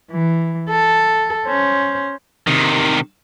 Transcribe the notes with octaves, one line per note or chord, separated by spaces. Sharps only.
E3
A4
C#4 C5
C3 D#3